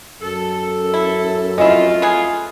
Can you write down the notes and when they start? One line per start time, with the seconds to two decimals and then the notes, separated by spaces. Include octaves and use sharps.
0.22 F#2 A4
0.94 E4
1.58 F2 A3 C#4 E4 F4 D#5
2.02 B3 G#4